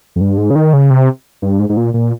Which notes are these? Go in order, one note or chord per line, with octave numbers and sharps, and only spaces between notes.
F2
G2
G#2
C#3
D#3
C#3
C3
G2
G#2
G#2
A#2
A#2